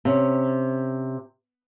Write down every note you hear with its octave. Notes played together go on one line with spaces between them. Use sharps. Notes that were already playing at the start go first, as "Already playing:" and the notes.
C3 C#4